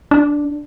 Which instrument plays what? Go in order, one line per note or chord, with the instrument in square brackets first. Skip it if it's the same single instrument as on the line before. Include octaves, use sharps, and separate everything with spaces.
[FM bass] D4